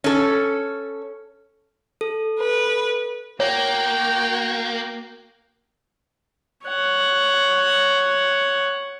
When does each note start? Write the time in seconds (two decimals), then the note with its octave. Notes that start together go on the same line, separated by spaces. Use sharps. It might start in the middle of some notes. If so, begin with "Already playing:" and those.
0.04 C#4 A4
2.01 A4
2.39 B4
3.40 A#3 F#4 C#5 G5
6.65 C#5 F#5